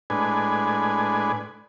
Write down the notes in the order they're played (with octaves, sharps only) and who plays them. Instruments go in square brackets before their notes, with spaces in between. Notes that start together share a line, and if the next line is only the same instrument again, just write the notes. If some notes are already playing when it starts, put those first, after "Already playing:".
[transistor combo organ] A2 G#3 D4 B4 G#5